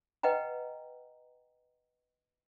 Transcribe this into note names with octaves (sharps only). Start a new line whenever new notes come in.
B4 D#5 F#5 G5 A#5